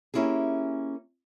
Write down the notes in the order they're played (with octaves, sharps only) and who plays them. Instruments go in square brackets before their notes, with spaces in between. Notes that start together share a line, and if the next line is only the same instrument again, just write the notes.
[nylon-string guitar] A#3 C#4 E4 G4 G#4